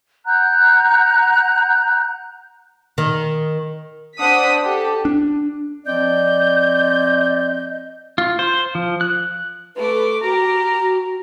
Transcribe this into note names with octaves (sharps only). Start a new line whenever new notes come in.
F#5 A#5 F#6 G6
D#3
D4 C5 F#5 D#6 B6
G4 A4
D4
F3 C4 D5 D#5 G6
F4
C5
F3
F#6
A3 B4 D6
F#4 G4 A#4 A#5
F#4